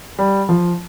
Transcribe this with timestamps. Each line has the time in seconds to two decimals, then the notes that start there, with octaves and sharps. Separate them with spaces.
0.19 G3
0.49 F3